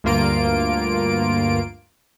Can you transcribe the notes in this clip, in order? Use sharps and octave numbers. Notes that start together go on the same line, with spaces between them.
D2 G2 A#3 F4 D7